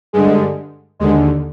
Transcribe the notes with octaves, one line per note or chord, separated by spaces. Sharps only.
G2 D3 G#3
D#2 D3 G#3